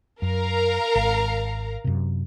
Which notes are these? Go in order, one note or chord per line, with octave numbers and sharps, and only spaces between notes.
F#2 A#4 F5 A#5
G#1
F#2 C3